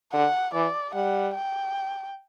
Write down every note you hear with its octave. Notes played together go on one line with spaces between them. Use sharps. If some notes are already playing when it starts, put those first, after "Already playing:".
D3 F#5
E3 D5
G3 F#5
G5